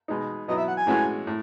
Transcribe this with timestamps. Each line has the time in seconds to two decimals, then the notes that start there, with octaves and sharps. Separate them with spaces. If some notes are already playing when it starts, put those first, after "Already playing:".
0.08 B2 G#3 D#4
0.48 B2 F#3 B3 E4 D#5
0.58 E5
0.68 F#5
0.77 G#5
0.87 A2 E3 G#3 C#4 F#4
1.27 A2